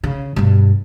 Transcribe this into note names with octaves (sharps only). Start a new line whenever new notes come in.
C#3
G2 B2